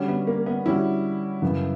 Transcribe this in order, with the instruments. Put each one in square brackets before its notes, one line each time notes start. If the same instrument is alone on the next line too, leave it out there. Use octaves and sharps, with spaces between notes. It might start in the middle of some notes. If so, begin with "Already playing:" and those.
Already playing: [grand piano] D3 G3 C#4 F#4
[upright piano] B3
A#3
B3
[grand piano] D3 G3 C#4 F#4 [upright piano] E4
[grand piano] F#2 C#3 E3 B3